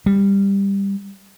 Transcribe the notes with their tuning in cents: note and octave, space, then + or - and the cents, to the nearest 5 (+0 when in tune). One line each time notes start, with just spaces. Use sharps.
G3 +15